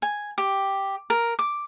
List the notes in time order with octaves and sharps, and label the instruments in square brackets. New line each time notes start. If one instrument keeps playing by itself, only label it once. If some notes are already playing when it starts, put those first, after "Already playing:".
[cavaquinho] G#5
G4
A#4
D6